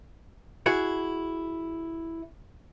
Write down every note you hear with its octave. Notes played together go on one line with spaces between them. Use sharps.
E4 F#4 G#4